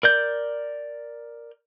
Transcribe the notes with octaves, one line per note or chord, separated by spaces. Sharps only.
A#4 D5 G6